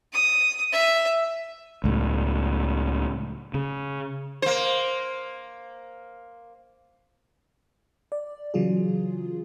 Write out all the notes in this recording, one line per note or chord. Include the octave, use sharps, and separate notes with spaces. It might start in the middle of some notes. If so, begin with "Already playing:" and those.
D#6
E5
C#2 A2
C#3
A#3 C5
D5
C#3 E3 F#3 F4 G#4